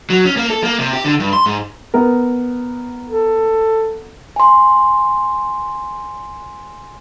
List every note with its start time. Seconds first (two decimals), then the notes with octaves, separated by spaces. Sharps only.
0.10 F#3
0.25 C#4
0.37 A#3
0.50 A4
0.63 A#3
0.79 C3
0.93 G4
1.05 D3
1.20 G2
1.33 C6
1.46 G#2
1.94 B3 A#4
3.07 A4
4.36 G#5 C6